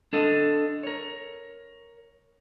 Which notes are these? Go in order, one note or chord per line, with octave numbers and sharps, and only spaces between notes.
D4 A4 D#5 F5
A#4 C#5